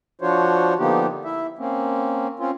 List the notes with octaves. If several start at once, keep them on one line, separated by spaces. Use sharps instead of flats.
F3 D4 F4 F#4 C5 C#5
D3 F3 A#3 B3 D#4 G4
E4 E5
A#3 C4 C#4
C4 C#4 F4